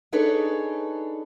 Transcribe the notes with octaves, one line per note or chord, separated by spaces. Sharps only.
D4 D#4 G#4 A4 B4 C#5